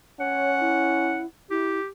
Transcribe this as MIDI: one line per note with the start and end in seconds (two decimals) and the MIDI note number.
0.20 1.24 61
0.20 0.56 73
0.20 1.22 78
0.60 1.26 64
1.50 1.79 64
1.50 1.88 67